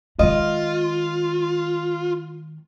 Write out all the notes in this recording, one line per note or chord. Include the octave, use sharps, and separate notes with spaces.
D#3 G#3 F4 D#5